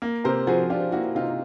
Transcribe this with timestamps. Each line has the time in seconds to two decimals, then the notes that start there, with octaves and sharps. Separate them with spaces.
0.02 A#3
0.24 C3 A#4 C5
0.47 F3 F#4 G#4
0.70 D4 F4 G4
0.92 A#3 E4 F#4
1.15 C3 D#4 F4